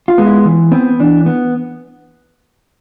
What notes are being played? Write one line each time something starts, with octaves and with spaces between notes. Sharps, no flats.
F4
G#3 B3
E4
E3
B3 C4
E3 D4
B3